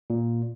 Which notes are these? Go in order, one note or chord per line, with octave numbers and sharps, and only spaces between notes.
A#2